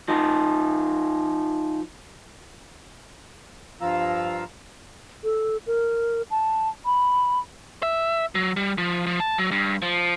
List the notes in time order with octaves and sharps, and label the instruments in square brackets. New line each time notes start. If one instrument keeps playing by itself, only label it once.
[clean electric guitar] F3 D#4
[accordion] G2 F3 F4 F5 A#5 E6
[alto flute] A4
A#4
A5
B5
[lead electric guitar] E5
F#3
G3
F3
F3
A5
F#3
G2
F3